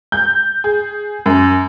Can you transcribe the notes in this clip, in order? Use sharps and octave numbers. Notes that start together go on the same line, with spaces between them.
G6
G#4
F#2